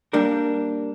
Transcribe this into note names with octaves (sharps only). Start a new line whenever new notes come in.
G3 A#3 D4 A#4